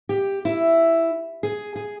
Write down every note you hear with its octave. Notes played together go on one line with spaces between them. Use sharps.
G4
E4
G#4
G#4